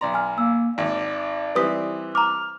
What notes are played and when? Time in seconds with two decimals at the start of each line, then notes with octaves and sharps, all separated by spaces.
0.01 B1 D5 A#5 C6
0.14 G#5 F6
0.38 A#3 E6
0.78 G#1 D5
1.55 E3 G3 C4 B4 D#6 B6
2.15 A#5 D6 F6